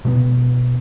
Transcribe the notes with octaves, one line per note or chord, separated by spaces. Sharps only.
B2 G#3 A3 B3